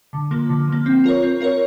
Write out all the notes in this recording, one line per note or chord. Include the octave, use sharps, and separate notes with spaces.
D3
F3 A#3
D3
F3 A#3
C4
F4 A#4 C#5
C4
F4 A#4 C#5